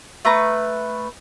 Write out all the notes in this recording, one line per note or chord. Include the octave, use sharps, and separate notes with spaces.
A3 B4 A#5